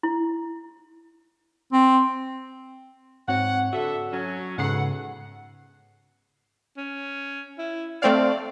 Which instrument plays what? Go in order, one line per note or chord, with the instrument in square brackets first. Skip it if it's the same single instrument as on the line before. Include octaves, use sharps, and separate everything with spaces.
[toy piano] E4
[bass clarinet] C4
[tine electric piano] G#2 C4 [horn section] C#5 F#5
[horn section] D3 A4 E5 [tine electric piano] F#4
[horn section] F#3 C#4
[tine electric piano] G#2 C#3 C7 [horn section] B3 A4 F#5
[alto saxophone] C#4
E4
[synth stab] A3 C4 F5 [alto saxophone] D5